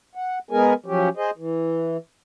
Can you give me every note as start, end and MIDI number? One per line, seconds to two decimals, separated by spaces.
0.15 0.39 78
0.51 0.74 56
0.51 0.74 59
0.51 0.74 68
0.51 0.74 70
0.51 0.74 80
0.86 1.09 53
0.86 1.09 54
0.86 1.09 61
0.86 1.09 67
1.17 1.31 68
1.17 1.31 72
1.17 1.31 75
1.38 1.97 52